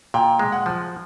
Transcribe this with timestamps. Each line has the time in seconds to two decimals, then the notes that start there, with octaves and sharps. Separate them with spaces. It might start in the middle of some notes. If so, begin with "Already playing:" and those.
0.14 A#2 G5
0.39 G#3
0.52 F#5
0.66 F3